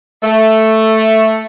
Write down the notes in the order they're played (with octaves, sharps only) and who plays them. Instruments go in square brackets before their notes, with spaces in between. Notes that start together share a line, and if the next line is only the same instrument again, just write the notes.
[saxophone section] A3